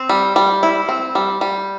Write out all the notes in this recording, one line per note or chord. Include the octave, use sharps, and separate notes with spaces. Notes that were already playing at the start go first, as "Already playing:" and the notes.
Already playing: C4
G3
G3
E4
C4
G3
G3